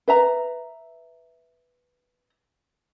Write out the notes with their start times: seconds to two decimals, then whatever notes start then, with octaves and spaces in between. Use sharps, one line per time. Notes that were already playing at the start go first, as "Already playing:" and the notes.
0.08 B4 E5 A#5